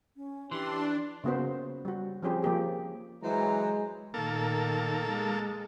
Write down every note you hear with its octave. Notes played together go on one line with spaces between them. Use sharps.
C#4
E3 D4 G4 C6
C#3 A#3 B3 F#4 C5
G3 F#4
F3 C4 C#4 G4 G#4 C5
F3 A#3 G4 G#4
E3 F#3 G#3 C5 A#5
A#2 D#3 A#3 A4
G#3